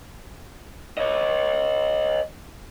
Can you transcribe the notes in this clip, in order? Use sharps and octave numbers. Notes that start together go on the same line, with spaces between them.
C#5 D#5